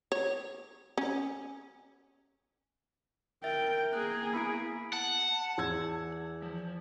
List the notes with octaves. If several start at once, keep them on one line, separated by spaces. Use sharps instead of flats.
C#5
C#4
A#4 E5 G5 A6
A#3 G#4 F#6
B3 E4 B5 D7
F#5 A5
E2 E6 G#6
F3